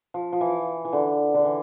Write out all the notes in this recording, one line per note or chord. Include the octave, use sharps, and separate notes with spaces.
F3
F3
E3
E3
D3
D3
E3